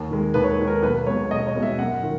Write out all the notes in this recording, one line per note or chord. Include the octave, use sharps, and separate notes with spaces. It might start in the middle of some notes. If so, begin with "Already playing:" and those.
Already playing: D#2
D#3 G#3
D#2 B4
C#5
B4
D#3 G#3
A#4
B1 B4
B4
B2 G#3 C#5
B1 D#5
C#5
B2 G#3
E5
F#2 F#5
D#3